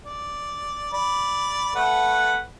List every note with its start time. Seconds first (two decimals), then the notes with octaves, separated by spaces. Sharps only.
0.04 D5
0.93 D5 B5
1.75 A3 B4 F#5